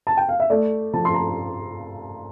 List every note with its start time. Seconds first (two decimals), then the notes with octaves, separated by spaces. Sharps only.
0.07 A5
0.17 G5
0.29 F5
0.40 E5
0.50 A3 D5
0.93 F3 A5
1.05 C6
1.14 A#5